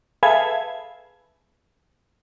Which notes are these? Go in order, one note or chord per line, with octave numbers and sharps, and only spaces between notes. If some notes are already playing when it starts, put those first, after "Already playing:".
G#4 A4 B4 E5 F5 G#6